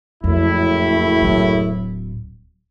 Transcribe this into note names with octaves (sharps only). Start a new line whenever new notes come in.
F#1 F2 A2 E4
D1 F#3